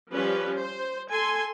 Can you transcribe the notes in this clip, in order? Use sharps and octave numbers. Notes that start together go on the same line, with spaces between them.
F3 G3 C#4 G4 B4
C5
A4 G#5 C6